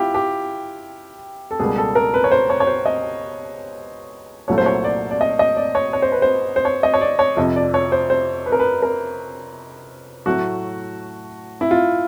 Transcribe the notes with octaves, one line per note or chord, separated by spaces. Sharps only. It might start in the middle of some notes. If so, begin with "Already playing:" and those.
Already playing: E4 F4 G4
G4
A4
C#2 B2 G3 A#3 G#4
A4
A#4
B4
C#5
C5
C#5
C#5
C5
D#5
C2 A#2 F#3 A3 C#5
C5
C#5
D5
D5
D#5
D#5
D5
C#5
C#5
C5
B4
C5
C5
C#5
D#5
C#5
D5
C#5
F2 C3 F3 D#5
D5
C#5
C5
C5
B4
A#4
B4
A#4
A2 F#3 A3 F#4
E4
F4